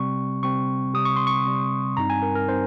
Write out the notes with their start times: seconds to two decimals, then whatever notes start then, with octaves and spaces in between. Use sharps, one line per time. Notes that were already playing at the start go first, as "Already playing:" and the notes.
Already playing: C3 G3 C4 C#6
0.43 C3 G3 C4 C#6
0.94 C3 G3 C4 D#6
1.05 C#6
1.16 C6
1.27 C#6
1.46 C3 G3 C4
1.97 G2 G3 C4 D#4 A#5
2.10 G#5
2.23 A#4
2.35 A#4
2.48 G3 C4 D#4 C5